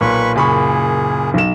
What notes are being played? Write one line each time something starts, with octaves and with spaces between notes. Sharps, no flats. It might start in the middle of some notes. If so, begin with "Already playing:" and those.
B1 A#2 B4 B5 C#6
F#1 G#4 B5 C#6
B1 E7